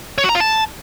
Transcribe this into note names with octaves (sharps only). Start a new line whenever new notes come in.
C#5
F#4
A#5
F4
A5